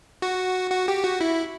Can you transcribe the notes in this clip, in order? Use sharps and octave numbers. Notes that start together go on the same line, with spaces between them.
F#4
F#4
G4
F#4
E4